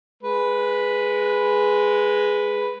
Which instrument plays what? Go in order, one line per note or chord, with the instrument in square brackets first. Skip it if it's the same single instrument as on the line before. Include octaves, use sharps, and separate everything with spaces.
[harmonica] G#3 B4